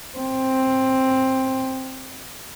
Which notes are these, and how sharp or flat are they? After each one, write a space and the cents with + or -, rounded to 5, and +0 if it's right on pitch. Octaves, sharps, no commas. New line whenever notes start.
C4 +10